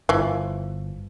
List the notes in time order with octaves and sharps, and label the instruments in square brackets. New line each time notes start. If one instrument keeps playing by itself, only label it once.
[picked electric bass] G1 [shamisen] E3 F3